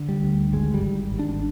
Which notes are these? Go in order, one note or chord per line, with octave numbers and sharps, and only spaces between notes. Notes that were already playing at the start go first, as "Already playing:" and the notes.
Already playing: D3
G3
D2
G#1 G#3
G3
G#1
G#1
D4